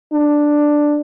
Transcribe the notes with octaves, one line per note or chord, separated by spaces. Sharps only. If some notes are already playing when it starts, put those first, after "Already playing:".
D4